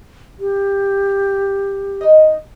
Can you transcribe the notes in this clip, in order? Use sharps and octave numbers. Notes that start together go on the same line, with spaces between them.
G4
D#4 D#5